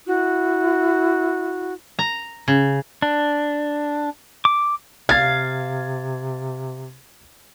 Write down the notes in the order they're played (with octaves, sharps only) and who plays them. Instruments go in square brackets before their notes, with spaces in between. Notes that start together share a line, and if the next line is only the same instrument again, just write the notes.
[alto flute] E4 [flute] F#4
[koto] A#5
C#3
[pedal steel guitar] D4
D6
[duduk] C3 [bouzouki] F5 [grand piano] G#6 A6